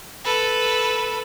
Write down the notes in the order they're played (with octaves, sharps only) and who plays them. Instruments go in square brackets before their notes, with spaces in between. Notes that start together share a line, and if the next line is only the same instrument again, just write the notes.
[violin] A4 B4